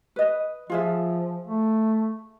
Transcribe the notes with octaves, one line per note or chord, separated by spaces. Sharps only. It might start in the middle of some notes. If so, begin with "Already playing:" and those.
B4 D#5
F3 F4 G#4 E5
A3